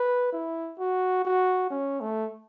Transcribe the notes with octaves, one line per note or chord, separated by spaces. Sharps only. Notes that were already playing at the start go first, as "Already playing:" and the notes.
Already playing: B4
E4
F#4
F#4
C#4
A3